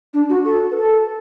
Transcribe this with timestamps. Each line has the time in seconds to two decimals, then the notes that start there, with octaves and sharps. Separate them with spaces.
0.14 D4
0.29 F#4
0.45 A4
0.71 B4
0.76 A4